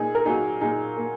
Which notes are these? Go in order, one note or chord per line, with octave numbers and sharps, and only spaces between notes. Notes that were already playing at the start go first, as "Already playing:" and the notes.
Already playing: A#2 D#4 G#4
A#4
F#3 A#3 D#4 G#4
A#2 D#4 G#4
A#3